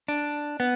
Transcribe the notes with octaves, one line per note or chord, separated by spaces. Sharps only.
D4
B3